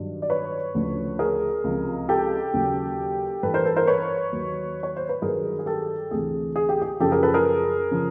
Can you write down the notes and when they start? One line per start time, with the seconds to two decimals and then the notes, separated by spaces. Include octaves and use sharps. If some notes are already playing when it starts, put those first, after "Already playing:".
Already playing: G2 D#3 F#3
0.22 D5
0.30 B4 C#5
0.75 D2 C#3 F3
1.19 G#4 A#4
1.64 C#2 C3 F3
2.09 G4 A4
2.53 D#2 C#3 F#3
3.43 G2 E3 A4 B4
3.54 A#4 C5
3.65 A4 B4
3.76 A#4 C5
3.87 B4 C#5
4.32 D#2 D#3 F#3
4.83 C#5
4.96 C5
5.09 B4
5.22 G2 D#3 F#3 G#4 A#4
5.59 G#4
5.66 G4 A4
6.11 D2 C3 E3 G#4
6.56 G#4
6.69 G4
6.82 G#4
7.00 F#2 C#3 F3 G4 A4
7.12 G#4 A#4
7.23 A4 B4
7.34 G#4 A#4
7.91 C#3 F3